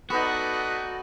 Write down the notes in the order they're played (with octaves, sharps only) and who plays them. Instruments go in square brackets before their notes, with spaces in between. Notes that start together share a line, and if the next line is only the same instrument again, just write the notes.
[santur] B3 D#4 [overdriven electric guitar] F#4 [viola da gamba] A4 D5 D#5 [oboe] B4